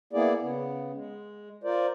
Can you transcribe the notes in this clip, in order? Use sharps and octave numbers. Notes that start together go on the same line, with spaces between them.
A#3 B3 E4 G#4 D5
C#3 B3
G#3
F4 A#4 C5 D5